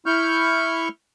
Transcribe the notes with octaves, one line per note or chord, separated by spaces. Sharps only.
E4 C#6 F6 G6